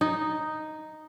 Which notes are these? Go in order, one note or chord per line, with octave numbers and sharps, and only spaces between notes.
D#4